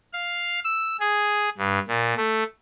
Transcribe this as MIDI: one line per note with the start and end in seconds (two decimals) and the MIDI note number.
0.13 0.60 77
0.64 0.97 88
1.00 1.49 68
1.58 1.79 43
1.88 2.14 46
2.17 2.44 57